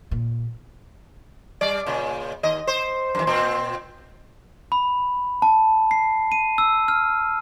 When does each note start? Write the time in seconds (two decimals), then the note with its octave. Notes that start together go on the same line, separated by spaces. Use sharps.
0.11 A#2
1.61 G3 D5
1.86 A#2 C#3
2.43 D#2 D#5
2.67 C5
3.15 F#2 E3
3.27 A#2 C4
4.72 B5
5.42 A5
5.91 C7
6.32 D#7
6.58 E6
6.88 F6